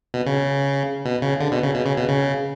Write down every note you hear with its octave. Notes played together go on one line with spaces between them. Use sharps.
B2
C#3
B2
C#3
D3
B2
C#3
B2
C#3
B2
C#3